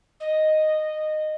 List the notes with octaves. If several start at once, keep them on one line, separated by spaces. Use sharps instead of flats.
D#5